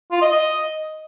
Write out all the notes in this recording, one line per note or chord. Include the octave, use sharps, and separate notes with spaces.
F4
D#5
D#5